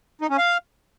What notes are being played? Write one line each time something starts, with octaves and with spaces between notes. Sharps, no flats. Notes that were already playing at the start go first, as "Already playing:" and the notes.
D#4
C#4
F5